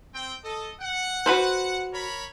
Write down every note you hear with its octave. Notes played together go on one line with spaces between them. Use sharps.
C4 G5
A4 D#5
F#5
F#4 B4 C5
A#4 C#5 B5